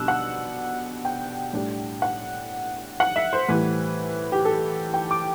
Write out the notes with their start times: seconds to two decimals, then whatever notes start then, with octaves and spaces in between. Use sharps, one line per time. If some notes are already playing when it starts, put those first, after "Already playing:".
Already playing: B2 G3 D4 E6 F#6
0.08 F#5
1.05 G5
1.53 A2 G3 D4
2.02 F#5
3.00 F#5
3.16 E5
3.33 C5
3.48 A2 E3 G3 B4
4.32 G4
4.45 A4
4.94 G5
5.11 D6